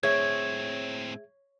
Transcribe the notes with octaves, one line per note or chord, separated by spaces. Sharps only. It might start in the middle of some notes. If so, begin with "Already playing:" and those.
A2 C4 G#4 C#5 E5 G#6